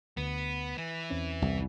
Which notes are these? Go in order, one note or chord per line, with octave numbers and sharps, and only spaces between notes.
D2 B3
E3
E2 C4 C#4
C2